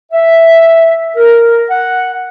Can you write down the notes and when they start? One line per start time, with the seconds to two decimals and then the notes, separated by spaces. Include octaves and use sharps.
0.12 E5
1.16 A#4
1.70 F#5